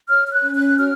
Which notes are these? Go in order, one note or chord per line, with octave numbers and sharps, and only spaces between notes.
C#5 F6
F6
F#6
C#4
F#6
F#4 F6